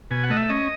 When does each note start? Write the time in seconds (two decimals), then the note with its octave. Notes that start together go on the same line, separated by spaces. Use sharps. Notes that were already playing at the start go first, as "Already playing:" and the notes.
0.11 B2 G#5
0.23 F#5
0.30 A3 D#5
0.37 E5
0.49 C#4 D#5